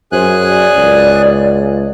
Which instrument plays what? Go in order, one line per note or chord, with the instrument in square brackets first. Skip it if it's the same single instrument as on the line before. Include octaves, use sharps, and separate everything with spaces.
[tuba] F#2 [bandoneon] G#4 G#5 F#6 [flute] C5
[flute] D5
[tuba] C#2